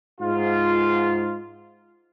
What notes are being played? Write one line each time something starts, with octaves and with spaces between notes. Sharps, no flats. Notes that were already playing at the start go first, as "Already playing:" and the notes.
G#2 F4